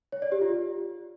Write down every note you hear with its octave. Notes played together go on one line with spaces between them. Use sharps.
C#5
D5
G4
F4